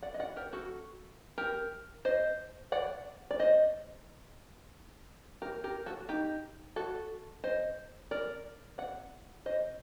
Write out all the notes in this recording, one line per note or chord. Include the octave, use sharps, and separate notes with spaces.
D5 F#5
D#5
D5 F#5
G4 A#4
F#4 A4
G4 A#4
C5 D#5
D5 F#5
D5
C5 D#5
G4 A#4
G4 A#4
F#4 A4
D#4 G4
F#4 A4
C5 D#5
A#4 D5
D5 F#5
C5 D#5